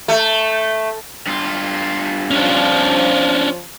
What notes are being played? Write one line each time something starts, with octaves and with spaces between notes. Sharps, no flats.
A3
G2 F4
F3 C#4 D4